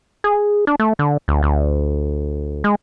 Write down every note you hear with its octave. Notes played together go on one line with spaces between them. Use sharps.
G#4
D4
A3
D3
D2
D2
G#3